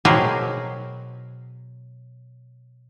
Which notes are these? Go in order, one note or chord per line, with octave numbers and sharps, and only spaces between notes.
B2 F#3 G4 G#4 A#4 C5